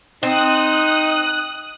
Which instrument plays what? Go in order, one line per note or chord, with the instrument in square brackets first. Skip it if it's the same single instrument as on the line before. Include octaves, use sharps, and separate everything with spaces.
[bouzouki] C4 [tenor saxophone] D#4 [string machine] D#6 F#6